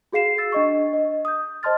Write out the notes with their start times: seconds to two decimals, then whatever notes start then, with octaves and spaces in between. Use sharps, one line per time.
0.13 F#4 G#4 F5 C7 E7
0.38 E6 A6
0.52 D4 D#5 C#6
0.93 D#5
1.25 D#6 G6
1.63 C5 D#5 A5 C6 F6 A6